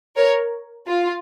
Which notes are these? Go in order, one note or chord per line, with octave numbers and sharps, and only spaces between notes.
A#4 C#5
F4